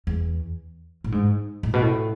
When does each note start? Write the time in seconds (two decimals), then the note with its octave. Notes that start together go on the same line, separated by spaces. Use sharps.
0.07 E2
1.04 A2
1.12 G#2
1.63 A2
1.74 B2
1.82 A2